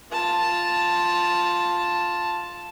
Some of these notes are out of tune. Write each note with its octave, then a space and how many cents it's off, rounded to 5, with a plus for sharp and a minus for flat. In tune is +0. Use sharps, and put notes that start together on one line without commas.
F4 +0 A5 +0